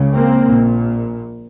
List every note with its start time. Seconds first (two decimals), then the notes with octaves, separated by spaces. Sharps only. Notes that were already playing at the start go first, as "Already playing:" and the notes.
Already playing: C#2 C#3
0.13 A#3 C4
0.45 A#1 A#2